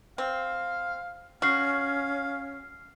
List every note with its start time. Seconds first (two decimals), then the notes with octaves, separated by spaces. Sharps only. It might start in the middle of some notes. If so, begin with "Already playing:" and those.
0.18 C4 F5
1.42 C#4 F#4 F5 F6 C7